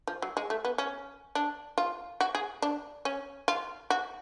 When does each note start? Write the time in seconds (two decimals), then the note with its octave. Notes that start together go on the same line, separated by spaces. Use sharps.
0.07 F3
0.22 F#3
0.37 G#3
0.50 A3
0.65 B3
0.78 C#4
1.35 D4
1.78 F4
2.21 F#4
2.35 G#4
2.62 D4
3.05 C#4
3.48 F4
3.90 F#4